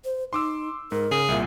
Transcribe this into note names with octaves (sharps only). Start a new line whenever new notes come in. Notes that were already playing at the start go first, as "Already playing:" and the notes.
C5
D#4 C6 D6 E6
G#2 A#4
C#3 G#4
C2 A#2 E5